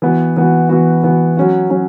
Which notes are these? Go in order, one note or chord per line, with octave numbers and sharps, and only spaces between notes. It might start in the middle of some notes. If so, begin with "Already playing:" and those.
E3 B3 F#4
E3 B3 F#4
E3 B3 F#4
E3 B3 F#4
F#3 C#4 F#4
F#3 C#4 F#4